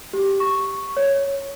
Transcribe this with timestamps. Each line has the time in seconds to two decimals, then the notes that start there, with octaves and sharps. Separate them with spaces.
0.13 G4
0.40 C#6
0.97 C#5